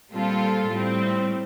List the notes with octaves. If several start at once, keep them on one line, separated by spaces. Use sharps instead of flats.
A#2 G3 C4 F4 A4
A2 G3 C4